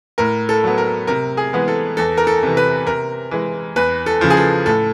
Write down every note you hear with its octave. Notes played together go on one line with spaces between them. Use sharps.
A2 A#4
A4
F#3 B3
A#4
C3 A#4
G#4
E3 G#3 B3
A4
E2 A4
A#4
A4
C3 E3
B4
C3 A#4
E3 G#3
E2 B4
A4
C#3 F3
G#4
A4
A2 A4